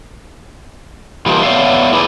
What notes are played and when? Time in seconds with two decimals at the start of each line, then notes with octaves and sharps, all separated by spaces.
1.26 E3 G3 A#3 D4 D#4 F4
1.43 B3 C#5 D5 E5 F5
1.93 E4 G#4 B4 D5